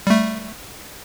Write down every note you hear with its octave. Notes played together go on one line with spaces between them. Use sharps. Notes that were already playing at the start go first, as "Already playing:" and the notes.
G3 A3